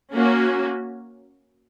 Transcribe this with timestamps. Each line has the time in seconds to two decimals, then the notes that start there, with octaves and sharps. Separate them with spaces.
0.15 A#3 C#4 F#4